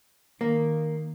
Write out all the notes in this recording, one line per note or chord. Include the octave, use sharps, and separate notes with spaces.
D#3 A#3